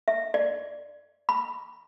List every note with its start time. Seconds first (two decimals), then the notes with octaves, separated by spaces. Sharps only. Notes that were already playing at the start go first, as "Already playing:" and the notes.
0.08 E5
0.34 D5
1.29 B5